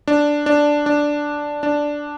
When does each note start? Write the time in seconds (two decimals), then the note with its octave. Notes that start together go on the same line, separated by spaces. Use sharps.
0.08 D4
0.46 D4
0.86 D4
1.63 D4